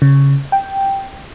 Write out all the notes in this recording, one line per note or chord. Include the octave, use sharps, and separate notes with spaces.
C#3
G5